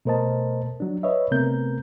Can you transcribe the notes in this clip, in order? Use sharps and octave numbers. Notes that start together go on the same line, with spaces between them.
B2 A3 A#4 C5 D#5 A5
F#3 D4
B4 C#5 D#5 E5
C3 A3 B3 C4 A#4 G6